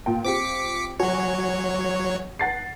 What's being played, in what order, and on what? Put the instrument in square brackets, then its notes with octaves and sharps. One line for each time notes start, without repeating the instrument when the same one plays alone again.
[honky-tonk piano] A#2 G5
[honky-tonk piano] C4 F4 G4 [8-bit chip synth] D6 B6 C#7
[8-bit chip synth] F#3 C#5 [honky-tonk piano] F#4 G#5
[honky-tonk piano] F#5 A6 C7